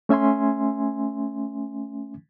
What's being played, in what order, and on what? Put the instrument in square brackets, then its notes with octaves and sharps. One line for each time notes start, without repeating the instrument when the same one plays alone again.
[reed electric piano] A3 C#4 E5 G#5 C6